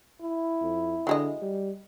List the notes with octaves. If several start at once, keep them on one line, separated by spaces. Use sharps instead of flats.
E4
F2
D3 F#3 G#3 D#5
G3